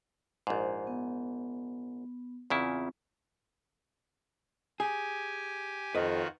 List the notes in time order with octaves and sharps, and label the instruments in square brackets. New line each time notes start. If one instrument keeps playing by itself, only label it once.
[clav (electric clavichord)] A#1 G#2 [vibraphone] C5
[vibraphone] B3
[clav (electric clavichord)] E2 C#3 E4 [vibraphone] C4 F4
[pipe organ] G4 G#5 [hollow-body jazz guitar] G#4
[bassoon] F2 [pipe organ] D#3 F4 F#4 [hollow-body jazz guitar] B4 D#5